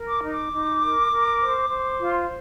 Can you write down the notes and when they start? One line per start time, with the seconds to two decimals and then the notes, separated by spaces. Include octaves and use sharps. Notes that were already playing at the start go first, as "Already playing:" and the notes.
Already playing: A#4
0.08 D6
0.23 D#4
0.30 D6
0.52 D#4
0.82 A#4
1.11 A#4
1.41 C5
1.69 C5
1.99 F4